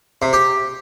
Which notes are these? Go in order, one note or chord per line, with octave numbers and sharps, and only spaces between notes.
C3
G4